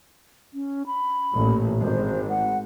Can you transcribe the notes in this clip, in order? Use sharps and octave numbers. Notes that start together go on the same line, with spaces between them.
C#4
B5
A1 A#2
G#1 C5
F#5